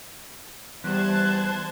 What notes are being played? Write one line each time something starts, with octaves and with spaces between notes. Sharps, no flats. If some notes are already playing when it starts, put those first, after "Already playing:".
E2 G3 C5 A5 F#6 G#6